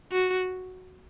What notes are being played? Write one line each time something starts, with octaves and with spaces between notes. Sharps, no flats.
F#4